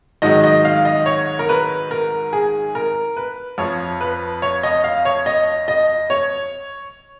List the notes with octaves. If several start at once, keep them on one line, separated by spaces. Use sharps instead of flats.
G#2 D#3 F#3 D#5
D#5
F5
D#5
C#5
A#4
B4
A#4
G#4
A#4
B4
F2 F3 C#5
B4
C#5
D#5
F5
C#5
D#5
D#5
C#5